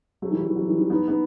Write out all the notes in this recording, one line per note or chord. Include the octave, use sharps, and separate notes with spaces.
F#3 A3
E3 G3
F#3
E3
F#3
E3 G3
E3 G3
B3 D#4
B3 D#4